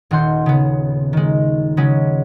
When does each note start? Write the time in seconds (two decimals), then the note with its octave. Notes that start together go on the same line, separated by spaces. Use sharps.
0.11 D#1 D#3 F#5 C6 G6
0.46 C#3 B3
1.13 D#3 G#3
1.77 C#3 F#3 G#3 C#4